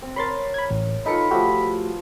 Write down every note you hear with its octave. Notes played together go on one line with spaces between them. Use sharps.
C4
A#4 C#5 B5 C6 A6
B5 G#6
A1
D#4 F4 A4 B4 G5 B5 C#7
F3 A3 F#4 G4 E6